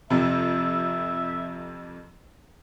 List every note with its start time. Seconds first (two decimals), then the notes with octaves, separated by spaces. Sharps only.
0.10 F2 C3 E5